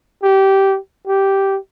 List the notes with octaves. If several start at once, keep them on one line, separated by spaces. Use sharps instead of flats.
G4
G4